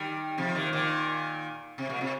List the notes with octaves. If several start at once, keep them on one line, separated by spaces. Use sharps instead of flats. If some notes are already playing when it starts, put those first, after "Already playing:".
Already playing: D#3 G3
C3 F3
A#2 D#3
A#2 D#3
C3
A#2
C3